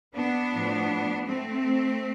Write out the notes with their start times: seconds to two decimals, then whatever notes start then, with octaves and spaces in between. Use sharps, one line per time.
0.15 B3 D4
0.52 A2 F3
1.27 A3 C4